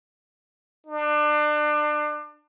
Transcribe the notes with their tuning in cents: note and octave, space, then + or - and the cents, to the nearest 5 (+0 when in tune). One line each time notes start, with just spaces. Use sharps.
D4 +30